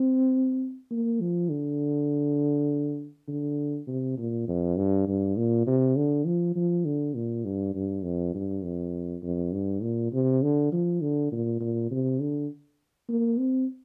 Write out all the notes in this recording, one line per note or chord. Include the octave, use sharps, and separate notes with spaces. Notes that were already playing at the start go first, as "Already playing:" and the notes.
Already playing: C4
A#3
F3
D3
D3
C3
A#2
F2
G2
G2
A#2
C3
D3
F3
F3
D3
A#2
G2
G2
F2
G2
F2
F2
G2
A#2
C3
D3
F3
D3
A#2
A#2
C3
D3
A#3
C4